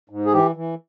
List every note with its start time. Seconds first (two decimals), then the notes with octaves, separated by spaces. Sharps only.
0.09 G#2
0.26 G#4
0.33 E3 G4
0.56 E3